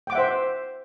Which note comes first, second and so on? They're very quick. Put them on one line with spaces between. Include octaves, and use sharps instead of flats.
G5 D6 F#5 E5 C5